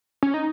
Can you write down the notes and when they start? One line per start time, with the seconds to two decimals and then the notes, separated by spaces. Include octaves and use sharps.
0.23 C#4
0.34 D#4